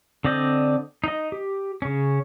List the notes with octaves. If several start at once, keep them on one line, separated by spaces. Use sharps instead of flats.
D3 C4 D5 D#5 G6
D#4 D#5
G4
C#3 C#4